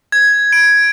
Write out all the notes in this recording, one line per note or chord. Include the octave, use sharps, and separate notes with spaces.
G#6
D7